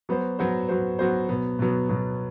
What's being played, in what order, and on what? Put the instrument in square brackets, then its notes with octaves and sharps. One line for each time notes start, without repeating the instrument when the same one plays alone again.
[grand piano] F#3 B3 F#4 C5
F#3 B3 F#4 C5
F#3 B3 F#4 C5
F#3 B3 F#4 C5
B2 F#3 B3
B2 F#3 B3
B2 F#3 B3